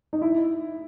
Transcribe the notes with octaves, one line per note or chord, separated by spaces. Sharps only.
D#4
E4